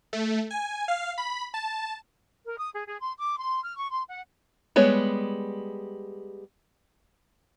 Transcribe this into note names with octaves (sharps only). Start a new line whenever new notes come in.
A3
G#5
F5
B5
A5
A#4
D#6
G#4
G#4
C6
D6
C6
F6
C#6
C6
F#5
G3 G#3 B3 C#5